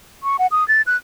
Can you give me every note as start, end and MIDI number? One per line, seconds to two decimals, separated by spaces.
0.23 0.37 85
0.39 0.47 78
0.52 0.66 87
0.68 0.82 93
0.87 0.96 90